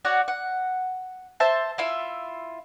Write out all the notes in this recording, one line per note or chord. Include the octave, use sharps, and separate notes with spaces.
F#4 C#5 D5 F#5
F#5
C5 E5 A5
E4 F4 E5